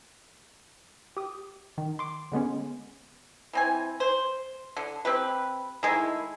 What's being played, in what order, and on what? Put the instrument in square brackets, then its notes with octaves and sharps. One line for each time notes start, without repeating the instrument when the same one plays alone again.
[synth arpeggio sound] G4 D#6
D#3
C6 D6
D3 G#3 B3 C#4
[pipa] E3 C4 G#5
C5
D3
C4 G4 B4
D#3 G#3 A3 E4